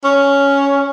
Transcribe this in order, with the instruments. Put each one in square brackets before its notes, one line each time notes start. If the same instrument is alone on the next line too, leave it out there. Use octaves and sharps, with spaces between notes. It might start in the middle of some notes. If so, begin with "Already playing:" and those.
[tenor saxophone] C#4